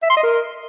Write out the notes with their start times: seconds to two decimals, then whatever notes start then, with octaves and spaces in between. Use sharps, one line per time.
0.03 E5
0.09 C6
0.16 D#5
0.23 A#4